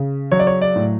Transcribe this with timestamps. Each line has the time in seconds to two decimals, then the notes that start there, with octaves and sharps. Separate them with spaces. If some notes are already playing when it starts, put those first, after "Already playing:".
Already playing: C#3
0.32 F#3 C#5
0.39 D5
0.47 C#5
0.61 D5
0.76 A2